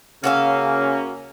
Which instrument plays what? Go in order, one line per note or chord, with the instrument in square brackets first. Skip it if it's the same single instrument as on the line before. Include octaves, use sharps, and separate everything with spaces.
[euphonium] C#3 [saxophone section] A#3 C#4 [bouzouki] F#4 E5 F5